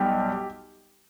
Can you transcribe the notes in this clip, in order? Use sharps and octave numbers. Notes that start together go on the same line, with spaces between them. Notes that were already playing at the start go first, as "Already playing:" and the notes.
Already playing: B1 G3 G4